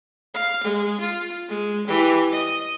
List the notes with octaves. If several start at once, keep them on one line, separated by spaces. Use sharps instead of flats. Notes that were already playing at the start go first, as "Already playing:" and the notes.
F5
G#3
F4
G#3
E3 G4
D#5